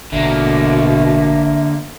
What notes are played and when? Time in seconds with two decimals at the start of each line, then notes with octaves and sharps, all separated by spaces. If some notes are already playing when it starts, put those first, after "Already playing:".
0.12 A1 B2 D3 A#3 E5